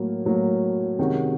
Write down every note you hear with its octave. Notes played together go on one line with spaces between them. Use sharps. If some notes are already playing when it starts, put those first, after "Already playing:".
Already playing: A2 F#3 A#3
A2 F#3 A#3
C3 D#3 G#3 C#4 F#4